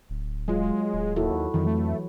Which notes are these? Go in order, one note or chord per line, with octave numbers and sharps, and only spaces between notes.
D1
F#3 G#3 F4
D1
D#2 E4 F#4 A4
F2 D#3 E3 F#3
A3